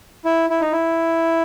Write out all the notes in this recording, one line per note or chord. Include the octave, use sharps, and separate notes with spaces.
E4
E4
D#4
E4